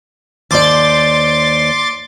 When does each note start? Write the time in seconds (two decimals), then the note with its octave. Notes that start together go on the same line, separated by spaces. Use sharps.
0.51 D#2 C5 D5 C6 D6 A6